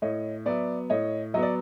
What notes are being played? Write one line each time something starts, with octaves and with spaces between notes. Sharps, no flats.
A2 C#5 D#5
F#3 B3 D5 E5
A2 C#5 D#5
F#3 B3 D#5
D5